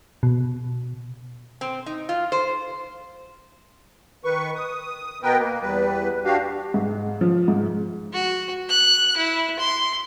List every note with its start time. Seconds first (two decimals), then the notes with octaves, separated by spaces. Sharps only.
0.23 B2
1.61 C4
1.86 D#4
2.09 F4
2.32 C5
4.24 D#3 B4 C#6
4.56 D#6
5.23 B2 B3 A#4 B4 G5
5.39 A#3
5.62 E2 G3 B4
6.25 D4 F#4 G4 F5
6.74 G#2
7.21 F3
7.48 G#2
8.13 F#4
8.70 F#6
9.17 E4
9.59 C6